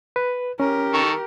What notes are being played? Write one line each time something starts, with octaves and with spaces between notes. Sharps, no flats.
B4
C#4 G4 A#4
D#3 A4 C#6